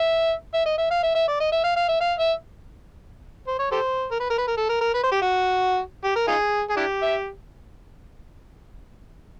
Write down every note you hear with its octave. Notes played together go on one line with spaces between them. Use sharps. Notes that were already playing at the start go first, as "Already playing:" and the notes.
Already playing: E5
E5
D#5
E5
F5
E5
E5
D5
D#5
E5
F5
F5
E5
F5
E5
C5
C#5
G4 A4 C5
A#4
B4
A#4
B4
A#4
A4
A#4
A#4
B4
C5
G4
F#4
G4
A#4
D#4 F4 G#4
G#4
D4 E4 G4
E5